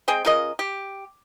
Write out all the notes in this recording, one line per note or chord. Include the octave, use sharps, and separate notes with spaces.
G#3 C4 G#4 G5
C#3 F4 A#4 D#5
G4